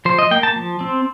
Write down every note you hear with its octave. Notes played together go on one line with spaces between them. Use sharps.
F3 C5
D#5
A#3 G5
A5
F3
C4